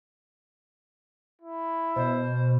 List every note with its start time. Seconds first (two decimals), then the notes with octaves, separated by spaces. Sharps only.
1.42 E4
1.96 B2 C5